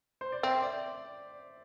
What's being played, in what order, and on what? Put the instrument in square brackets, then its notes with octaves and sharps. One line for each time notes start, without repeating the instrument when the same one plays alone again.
[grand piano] C5
D5
[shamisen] C4 [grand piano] C5 E5
[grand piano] D5